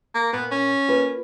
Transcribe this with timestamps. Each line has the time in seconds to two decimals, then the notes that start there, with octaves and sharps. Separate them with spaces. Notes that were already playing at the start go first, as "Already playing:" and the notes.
0.15 A#3
0.33 A#2 B3
0.51 C#4
0.88 A#3 F4 B4